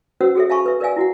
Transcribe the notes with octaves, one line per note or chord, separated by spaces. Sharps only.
C#4 F#4 B4 C5 F#5 E6
F#4 G#4 A4 C#5 E5
E5 F5 G#5 A5 B5 C#6
B4 E5
A#4 B4 D5 E5 F5 G#5
E4 F#4 F#5